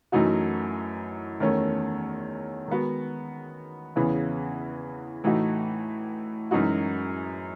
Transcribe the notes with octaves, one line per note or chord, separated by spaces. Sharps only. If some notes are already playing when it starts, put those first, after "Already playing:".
F#2 E3 A3 D#4 F#4
E2 D#3 A3 C#4
D#3 G#3 B3 F#4
E2 C#3 E3 B3
A2 E3 A3 D#4 F#4
F#2 E3 G#3 D#4 F#4